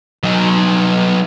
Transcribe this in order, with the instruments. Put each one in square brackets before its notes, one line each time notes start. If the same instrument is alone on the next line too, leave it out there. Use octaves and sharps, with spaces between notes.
[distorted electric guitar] F#3 D#4